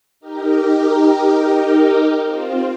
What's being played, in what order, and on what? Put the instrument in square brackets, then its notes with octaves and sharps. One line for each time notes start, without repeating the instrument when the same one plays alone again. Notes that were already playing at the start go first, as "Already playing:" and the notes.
[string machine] D#4 G4 A#4
C4 F4